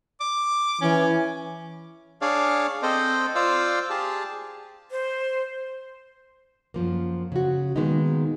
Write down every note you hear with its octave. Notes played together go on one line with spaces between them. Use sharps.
D6
E3 C#4
D4 G#4 C#5 D5 F5
C4 A4 C5 D#5
F4 C5 D5 F5 E6
G4 G#4 A5
C5
F#2 F3 A#3
C#3 F#4
A#2 D#3 G#3 A#3 B3 D#4